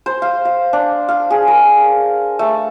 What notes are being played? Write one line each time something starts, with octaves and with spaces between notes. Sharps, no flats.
C5
F5
F5
D4
F5
G#4
A#4
A3